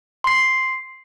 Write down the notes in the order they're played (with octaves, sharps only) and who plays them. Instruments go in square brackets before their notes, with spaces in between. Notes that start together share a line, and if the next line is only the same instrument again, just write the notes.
[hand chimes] C6 C7